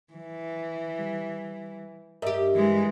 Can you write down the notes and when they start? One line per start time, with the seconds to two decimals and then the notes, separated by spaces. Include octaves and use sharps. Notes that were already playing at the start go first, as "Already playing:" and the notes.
0.13 E3
0.99 G3
2.22 G2 G4 A#4 D#5 E5
2.55 E3 G#3